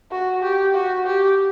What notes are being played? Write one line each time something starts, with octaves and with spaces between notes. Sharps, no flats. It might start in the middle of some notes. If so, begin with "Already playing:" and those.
F#4
G4
F#4
G4